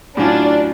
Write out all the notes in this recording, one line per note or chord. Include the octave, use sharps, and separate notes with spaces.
A2 F#3 C#4 D4 F4